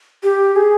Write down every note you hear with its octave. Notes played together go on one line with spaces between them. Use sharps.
G4
G#4